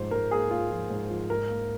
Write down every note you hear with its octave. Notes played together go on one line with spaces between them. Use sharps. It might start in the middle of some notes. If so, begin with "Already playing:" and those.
Already playing: G#2 F3 C5
G#2 A#4
A#3 G#4
A#3 F4
F3
G#2
F3
G#2 A#4
A#3